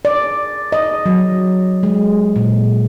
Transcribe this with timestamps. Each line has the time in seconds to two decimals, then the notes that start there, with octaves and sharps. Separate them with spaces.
0.05 D5
0.72 D#5
1.06 F#3
1.83 G#3
2.36 A#2